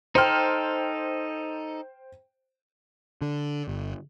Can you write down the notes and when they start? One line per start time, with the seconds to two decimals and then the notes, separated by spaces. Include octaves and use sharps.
0.15 D#4 A4 C5 G5 F6
3.22 D3
3.68 G1